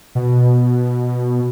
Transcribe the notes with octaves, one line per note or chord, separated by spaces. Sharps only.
B2